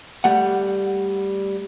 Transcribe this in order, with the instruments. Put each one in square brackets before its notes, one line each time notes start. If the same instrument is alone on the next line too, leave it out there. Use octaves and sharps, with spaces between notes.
[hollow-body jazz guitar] G3 A3 F#5